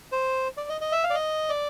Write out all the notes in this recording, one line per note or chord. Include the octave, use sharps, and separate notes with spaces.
C5
D5
D#5
D#5
E5
F5
D5
D#5
D5